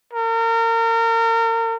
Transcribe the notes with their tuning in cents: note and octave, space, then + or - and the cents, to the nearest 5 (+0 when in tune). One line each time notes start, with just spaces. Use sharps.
A#4 -35